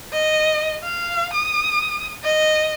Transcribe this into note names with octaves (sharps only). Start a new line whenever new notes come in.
D#5
F5
D#6
D#5